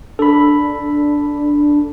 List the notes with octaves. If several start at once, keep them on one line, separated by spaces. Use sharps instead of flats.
D4 A4 B5